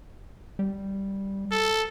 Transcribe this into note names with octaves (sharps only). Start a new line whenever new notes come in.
G3
A4